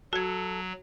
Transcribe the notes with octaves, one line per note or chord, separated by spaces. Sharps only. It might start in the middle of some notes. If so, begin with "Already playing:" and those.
F#3 F#4 A4 G#6